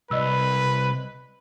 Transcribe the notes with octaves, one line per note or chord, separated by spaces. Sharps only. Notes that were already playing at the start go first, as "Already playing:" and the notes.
C2 B4 D5 D#5 E6